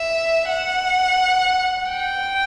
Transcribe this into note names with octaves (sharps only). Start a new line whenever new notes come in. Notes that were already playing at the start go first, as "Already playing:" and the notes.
Already playing: E5
F#5
G5